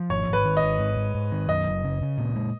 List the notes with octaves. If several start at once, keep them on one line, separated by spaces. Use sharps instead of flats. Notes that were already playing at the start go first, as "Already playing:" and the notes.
Already playing: F3
G#1 C#5
G#1 B4
D#3
D#5
G#1
G#2
G#2
G#2
D#3
F#2 D#5
F#1
C#3
C#3
A#2
G#3